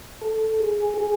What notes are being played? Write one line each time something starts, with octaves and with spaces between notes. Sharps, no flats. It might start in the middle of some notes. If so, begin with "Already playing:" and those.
A4
G#4
G#4